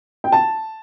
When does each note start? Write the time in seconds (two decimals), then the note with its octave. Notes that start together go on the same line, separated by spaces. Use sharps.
0.24 G5
0.32 A5